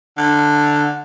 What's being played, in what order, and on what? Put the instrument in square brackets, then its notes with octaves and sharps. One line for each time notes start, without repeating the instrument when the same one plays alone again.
[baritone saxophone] D3